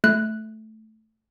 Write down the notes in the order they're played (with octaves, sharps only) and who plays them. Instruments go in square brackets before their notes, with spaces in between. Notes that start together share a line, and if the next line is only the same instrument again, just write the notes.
[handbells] A3 F#6